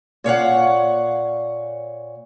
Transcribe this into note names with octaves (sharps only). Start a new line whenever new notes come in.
A#2 C#5 F5 F#5